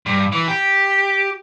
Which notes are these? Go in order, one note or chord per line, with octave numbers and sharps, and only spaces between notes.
G2
E3
G4